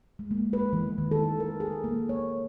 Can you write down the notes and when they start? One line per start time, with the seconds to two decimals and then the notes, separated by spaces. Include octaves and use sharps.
0.19 G#3
0.31 A#3
0.53 B4
0.73 E3
0.98 D#3
1.11 A4
1.40 A#4
1.60 G#4
1.84 A#3
2.09 C#5